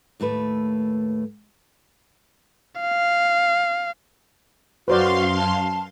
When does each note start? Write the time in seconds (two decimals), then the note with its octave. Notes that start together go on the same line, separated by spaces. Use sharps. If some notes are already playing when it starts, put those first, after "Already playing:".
0.20 D#2 A2 A3 B4
2.81 F5
4.88 F#2 F#4 B4 C5 D5 F5 C6
5.37 A5